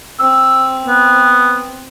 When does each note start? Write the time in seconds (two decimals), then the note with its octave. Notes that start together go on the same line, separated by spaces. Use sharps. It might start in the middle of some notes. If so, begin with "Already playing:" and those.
0.20 C4 E6
0.86 B3